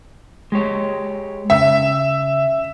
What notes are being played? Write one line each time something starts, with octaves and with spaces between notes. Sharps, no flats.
G#3 G4 C#5
C#3 E5